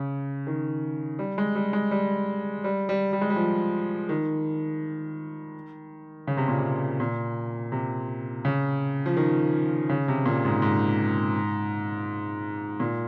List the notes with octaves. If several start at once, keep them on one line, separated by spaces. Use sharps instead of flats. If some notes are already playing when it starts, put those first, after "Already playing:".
Already playing: C#3
D#3
G3
G#3
G3
G#3
G3
G3
G3
G3
G#3
G3
F3
D#3
C#3
C3
A#2
C3
A#2
C3
C#3
F3
D#3
C#3
C3
A#2
G#2
G#2
A#2